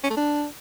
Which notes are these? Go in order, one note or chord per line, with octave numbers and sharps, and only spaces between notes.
C#4
A3
D4